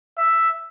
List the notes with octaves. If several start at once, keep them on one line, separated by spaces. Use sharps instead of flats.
E5